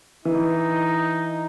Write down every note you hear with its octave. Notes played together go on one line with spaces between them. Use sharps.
E3 D#4